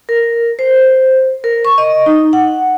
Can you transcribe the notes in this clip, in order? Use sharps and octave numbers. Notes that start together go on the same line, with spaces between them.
A#4
C5
A#4
C#6
D#5
D#4
F#5